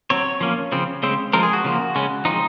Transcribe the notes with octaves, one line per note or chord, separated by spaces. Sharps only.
F#3 C4 C#5
F3 A#3 C#4
C#3 F3 C4
C#3 G#3 C4
F3 G#3 C4 A#4
G#4
F#4
C#3 F3 A#3
C#3 G#3 C#4
F3 G#3 C4 D#4